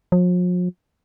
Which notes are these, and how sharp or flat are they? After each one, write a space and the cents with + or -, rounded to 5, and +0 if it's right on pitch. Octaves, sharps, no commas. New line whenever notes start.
F3 +45